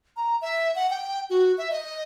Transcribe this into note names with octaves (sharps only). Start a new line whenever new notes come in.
A#5
E5
F#5
G5
F#4
E5
D#5